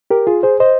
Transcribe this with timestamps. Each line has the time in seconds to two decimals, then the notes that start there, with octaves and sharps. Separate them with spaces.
0.10 G4 A#4
0.27 F4 G#4
0.43 G#4 C5
0.60 C5 D#5